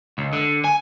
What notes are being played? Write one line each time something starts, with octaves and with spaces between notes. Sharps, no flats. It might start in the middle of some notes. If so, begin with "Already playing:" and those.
C#2
D3
G#5